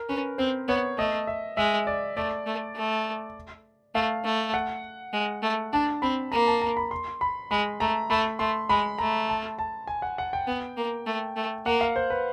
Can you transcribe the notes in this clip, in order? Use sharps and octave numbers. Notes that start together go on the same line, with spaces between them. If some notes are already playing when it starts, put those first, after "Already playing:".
Already playing: A#4
C#4 B4
C4 C5
B3 C#5
A3 D#5
E5
G#3 E5
D5
A3 D5
A3
A3
A3 F5
A3
F#5
G#3
A3
D4 A5
C4 B5
A#3 A#5
A5
A#5
B5
C6
B5
G#3 B5
A3 A#5
A3 B5
A3 C6
G#3 B5
A3 A#5
A5
A5
G#5
F#5
F#5
G5
B3
A#3
A3
A3
A#3 F#5
F5
C5
B4